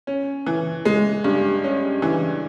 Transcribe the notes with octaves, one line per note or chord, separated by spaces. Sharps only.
C#4
E3
G#3
G2
C#4
E3